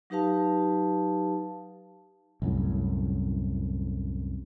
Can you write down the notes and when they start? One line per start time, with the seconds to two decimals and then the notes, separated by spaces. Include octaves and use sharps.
0.10 F#3 D#4 G4 B4 F5 A5
2.42 C2 F#2 A2